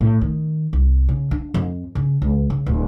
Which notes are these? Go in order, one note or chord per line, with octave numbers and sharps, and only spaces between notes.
A2
D#3
C2
C#3
D4
F2
C#3
C#2
C#3
D1